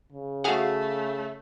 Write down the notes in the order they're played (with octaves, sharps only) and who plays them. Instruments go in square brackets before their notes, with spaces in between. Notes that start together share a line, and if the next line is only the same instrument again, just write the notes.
[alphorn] C#3
[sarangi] A3 [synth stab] F#4 G#4 F5